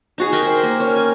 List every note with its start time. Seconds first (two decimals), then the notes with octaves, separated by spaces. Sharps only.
0.18 D#4 F#4 G#4
0.33 A#4 G5 G#5 B5
0.46 C5
0.63 A#3
0.80 C#4
0.96 G#5